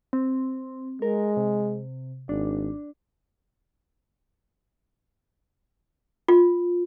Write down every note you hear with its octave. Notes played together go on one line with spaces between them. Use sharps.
C4
G#3 A#4
C3
G#1 D4
F4